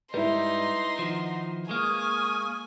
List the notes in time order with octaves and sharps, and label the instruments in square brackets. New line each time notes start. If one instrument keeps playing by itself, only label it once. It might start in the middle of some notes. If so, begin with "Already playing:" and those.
[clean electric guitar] G#2 G3 [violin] D#4 C6 [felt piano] E4 B4
[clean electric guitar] D#3 F3 [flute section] F#5
[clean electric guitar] G#3 A#3 [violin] G#5 [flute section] C#6 D#6 F6